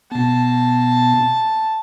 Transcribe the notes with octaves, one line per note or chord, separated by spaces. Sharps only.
B2 B3 A5